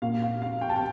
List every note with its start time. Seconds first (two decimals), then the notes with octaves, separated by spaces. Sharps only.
0.02 A#2 F5
0.22 F5
0.42 F5
0.61 G5
0.69 A5
0.76 G5